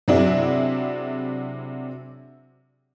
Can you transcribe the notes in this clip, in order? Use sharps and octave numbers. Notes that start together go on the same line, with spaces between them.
C3 F#3 D4 E4 G#4